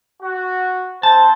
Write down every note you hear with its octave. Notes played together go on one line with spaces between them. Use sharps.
F#4
C4 C5 A5